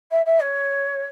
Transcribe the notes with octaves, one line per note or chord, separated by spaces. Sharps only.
E5
E5
C#5